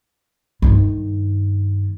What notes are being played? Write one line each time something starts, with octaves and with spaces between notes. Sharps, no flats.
G2 D#3